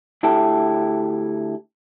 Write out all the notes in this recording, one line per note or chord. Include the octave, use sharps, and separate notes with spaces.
D2 E4 G4 A4